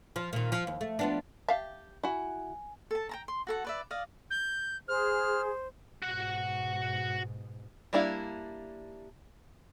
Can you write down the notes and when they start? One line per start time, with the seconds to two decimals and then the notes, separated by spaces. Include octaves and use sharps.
0.16 F3
0.33 A#2 D#3
0.52 F3
0.67 D#2
0.81 A3
0.99 F3 B3 D4
1.48 G4 E5 F5 A5
2.03 E4 F#4 G#5
2.91 A4 A5
3.09 G5 A5 A#5
3.28 C6
3.47 F#4 A4 F#5
3.65 B4 D5 E5
3.90 D5 D#5 F5
4.31 G6
4.88 G#4 C5 F6
6.02 G#2 B2 F#4 F#5
7.93 G3 A#3 D4 E4 F5